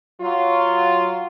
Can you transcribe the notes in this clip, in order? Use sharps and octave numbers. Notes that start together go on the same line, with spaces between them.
F#3 F4